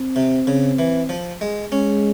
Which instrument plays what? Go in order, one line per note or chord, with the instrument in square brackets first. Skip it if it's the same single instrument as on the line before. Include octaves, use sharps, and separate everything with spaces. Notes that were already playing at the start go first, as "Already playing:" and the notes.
Already playing: [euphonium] C4
[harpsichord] C3
C#3
E3
F3
G#3
[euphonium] G#3 [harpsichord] C#4